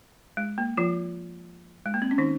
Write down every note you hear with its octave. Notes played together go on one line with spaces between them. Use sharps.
G#3
A#3
F3 F4
G#3
A#3
C4
C#4
D#3 D#4